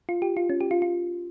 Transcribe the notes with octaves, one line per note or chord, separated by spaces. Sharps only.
F4
G4
F4
C#4
G4
F4
F4